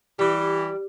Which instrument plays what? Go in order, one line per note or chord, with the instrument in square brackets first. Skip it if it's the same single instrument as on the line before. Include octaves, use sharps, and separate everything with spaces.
[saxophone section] E3 G4 [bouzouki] G3